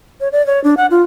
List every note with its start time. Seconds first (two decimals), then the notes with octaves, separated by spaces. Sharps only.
0.21 C#5
0.32 D5
0.46 C#5
0.64 D4
0.77 F#5
0.91 F4